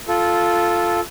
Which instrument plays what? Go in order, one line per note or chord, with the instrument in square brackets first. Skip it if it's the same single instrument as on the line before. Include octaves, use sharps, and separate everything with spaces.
[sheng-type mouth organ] F4 A4